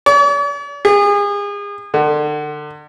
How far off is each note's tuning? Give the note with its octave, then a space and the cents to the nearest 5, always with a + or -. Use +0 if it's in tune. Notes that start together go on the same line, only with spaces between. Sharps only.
D5 -45
G#4 -35
D3 +35